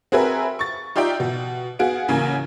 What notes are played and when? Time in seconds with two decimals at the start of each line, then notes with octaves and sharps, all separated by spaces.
0.12 C4 F#4 G#4 A#4 B4 E5
0.59 C#6 A6
0.96 D#4 F4 G4 D5 E5 G5
1.20 B2
1.79 B3 F#4 G#4 F5 D7
2.08 A1 C#3 A#3 G#5